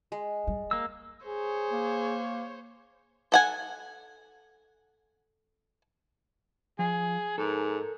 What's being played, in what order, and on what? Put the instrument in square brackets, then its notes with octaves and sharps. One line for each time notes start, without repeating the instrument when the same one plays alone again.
[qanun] G#3
[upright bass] G3
[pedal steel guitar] A#3 E6
[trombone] G#4 [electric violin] C5 C#5
[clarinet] A#3
[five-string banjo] A4 F#5 G#5
[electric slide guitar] F3 [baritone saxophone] G#4
[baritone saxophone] G#2 [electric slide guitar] A4 A#4